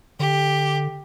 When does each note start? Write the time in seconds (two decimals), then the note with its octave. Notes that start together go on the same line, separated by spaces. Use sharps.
0.20 D3 G4